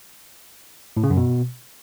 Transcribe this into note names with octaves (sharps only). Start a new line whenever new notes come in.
A2
C#3
F#2
B2